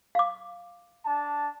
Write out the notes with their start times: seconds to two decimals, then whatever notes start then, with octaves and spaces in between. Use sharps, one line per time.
0.15 F5 D6
1.05 D4 A5